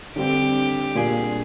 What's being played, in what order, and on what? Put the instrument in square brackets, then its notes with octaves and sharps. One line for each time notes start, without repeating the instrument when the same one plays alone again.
[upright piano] D3 G3 C4 [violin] G4
[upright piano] A#2 G3 A#3 D4 F4 [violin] G#4